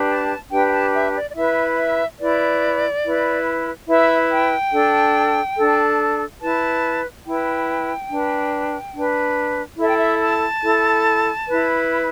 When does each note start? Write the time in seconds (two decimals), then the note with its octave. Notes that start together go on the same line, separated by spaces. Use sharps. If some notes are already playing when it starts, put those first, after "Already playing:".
Already playing: D4 G4 B4
0.08 A5
0.50 D4 G4 B4 G5
0.67 G5
0.71 A5
0.92 E5
1.14 D5
1.30 D5
1.34 E4 B4 E5
1.76 E5
2.19 E4 B4 D5
3.03 E4 B4
3.87 E4 B4 E5
4.30 G5
4.72 D4 A4
5.56 D4 A4
6.40 E4 B4 A5
7.25 E4 B4 G5
8.10 D4 B4
8.94 D4 B4
9.78 E4 A4 E5
9.87 G5
9.96 E5
10.20 A5
10.62 E4 A4
11.47 E4 B4